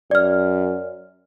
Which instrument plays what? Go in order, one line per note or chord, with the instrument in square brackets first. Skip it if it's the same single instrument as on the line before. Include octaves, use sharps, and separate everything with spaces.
[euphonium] F#2 [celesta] D5 F6